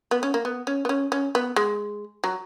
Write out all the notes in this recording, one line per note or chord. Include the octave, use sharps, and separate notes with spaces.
B3
C#4
A#3
B3
C#4
B3
C#4
C#4
B3
G#3
F#3